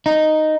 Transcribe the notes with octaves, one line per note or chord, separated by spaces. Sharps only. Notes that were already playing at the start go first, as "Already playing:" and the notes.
D#4